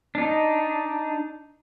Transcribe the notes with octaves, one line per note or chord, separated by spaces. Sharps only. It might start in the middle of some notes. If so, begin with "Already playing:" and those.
D4 D#4